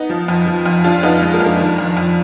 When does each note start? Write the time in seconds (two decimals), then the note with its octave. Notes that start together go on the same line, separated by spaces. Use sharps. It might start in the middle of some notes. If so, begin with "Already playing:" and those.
Already playing: B3 D#4
0.10 F3
0.28 F2
0.47 F3
0.66 F2
0.84 F3 D4 F4
1.03 F2 B3 D#4
1.22 F3 G#3
1.34 A#3
1.40 F2
1.46 A#3 D4
1.60 D#3
1.78 F2
1.97 F2